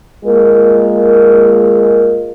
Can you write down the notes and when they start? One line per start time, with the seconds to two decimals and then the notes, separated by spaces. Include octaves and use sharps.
0.25 G#3 A#3 F4 A#4